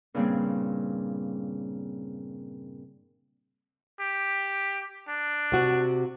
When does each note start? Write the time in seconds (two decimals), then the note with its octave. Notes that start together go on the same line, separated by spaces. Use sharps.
0.14 G2 A#2 C#3 G3 A#3 C4
4.00 G4
5.08 D4
5.52 C3 F#4